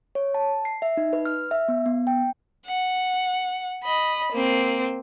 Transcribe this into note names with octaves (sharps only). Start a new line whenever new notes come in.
C#5
A5
C7
E5
D#4
B4
F6
E5
B3
B3
G5
F#5
D#5 B5
A#3 C4